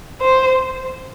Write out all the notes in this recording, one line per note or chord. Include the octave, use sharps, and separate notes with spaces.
C5